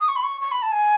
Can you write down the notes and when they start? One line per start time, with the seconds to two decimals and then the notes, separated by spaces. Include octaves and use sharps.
0.01 D#6
0.08 C#6
0.16 B5
0.23 C#6
0.41 C#6
0.52 B5
0.62 A5
0.72 G#5